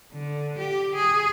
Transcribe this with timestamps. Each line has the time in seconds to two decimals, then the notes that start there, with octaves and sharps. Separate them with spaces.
0.13 D3
0.58 G4
0.95 G#4